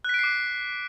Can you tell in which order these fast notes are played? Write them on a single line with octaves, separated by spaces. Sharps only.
F#6 B6 D7 C7 D6